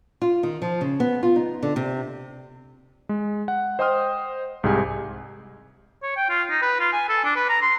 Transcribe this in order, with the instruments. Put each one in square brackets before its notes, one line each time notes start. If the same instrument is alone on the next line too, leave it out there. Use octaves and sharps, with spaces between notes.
[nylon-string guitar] F4
D#3
F3
C#3
B3
F4
D#4
D3
C3
[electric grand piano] G#3
F#5
C5 D#5 G5 C6 D#6 F6
C2 G#2 G4 G#4 G#5
[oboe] C#5
G5
F4
D#4
B4
F4
G#5
A4
D4
B4
A#5
C6